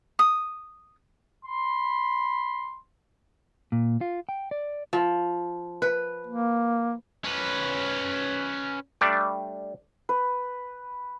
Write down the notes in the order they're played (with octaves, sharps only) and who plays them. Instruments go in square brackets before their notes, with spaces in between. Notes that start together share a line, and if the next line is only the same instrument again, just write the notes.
[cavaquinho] D#6
[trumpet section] B5 C6
[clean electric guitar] A#2
F4
G5
D5
[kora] F3
B4
[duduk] A#3
[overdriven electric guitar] C#4 B4
[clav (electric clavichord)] G3 A3 D4 D5
[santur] B4